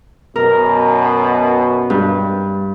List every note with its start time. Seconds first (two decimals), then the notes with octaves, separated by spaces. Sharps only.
0.36 F#2 B2 A#4
1.90 G2